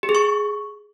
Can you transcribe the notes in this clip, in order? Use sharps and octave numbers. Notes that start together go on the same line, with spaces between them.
G4
G#4
C#6